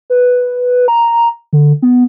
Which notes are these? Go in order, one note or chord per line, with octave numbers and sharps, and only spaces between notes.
B4
A#5
D3
B3